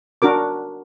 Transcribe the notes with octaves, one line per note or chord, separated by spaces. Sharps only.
D4 F#4 A#4 D6